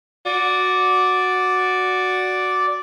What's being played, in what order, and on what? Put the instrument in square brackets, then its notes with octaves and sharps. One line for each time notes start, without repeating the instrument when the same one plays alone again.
[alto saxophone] F#4 [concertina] D5